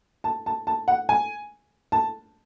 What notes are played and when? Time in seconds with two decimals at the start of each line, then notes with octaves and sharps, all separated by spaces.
0.24 A5
0.46 A5
0.67 A5
0.88 F#5
1.09 G#5
1.92 A5